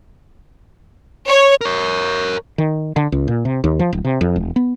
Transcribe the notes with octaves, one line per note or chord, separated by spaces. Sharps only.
C#5
A#4 C#5
D#3
D3
C#2
A#2
C3
D#2
F3
D1
C3
F2
E1
B3